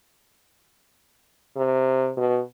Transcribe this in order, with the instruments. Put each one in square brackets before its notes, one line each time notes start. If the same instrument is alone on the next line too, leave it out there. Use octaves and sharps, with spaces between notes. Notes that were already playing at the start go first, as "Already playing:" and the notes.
[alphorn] C3
B2